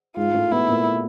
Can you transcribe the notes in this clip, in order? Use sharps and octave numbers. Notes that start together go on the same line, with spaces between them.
G#2 G#3 F4
G#3
A2 A3
B2 B3 E4
A#2 A#3